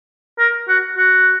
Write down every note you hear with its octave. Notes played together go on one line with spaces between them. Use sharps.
A#4
F#4
F#4